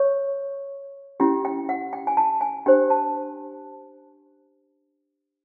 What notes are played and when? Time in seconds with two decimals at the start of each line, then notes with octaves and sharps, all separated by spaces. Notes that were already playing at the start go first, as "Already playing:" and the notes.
Already playing: C#5 C#6
1.20 C#4 E4 G4 G5
1.45 G5
1.69 F#5
1.93 G5
2.07 G#5
2.17 A5
2.41 G#5
2.66 D4 G4 C5 G5
2.90 A5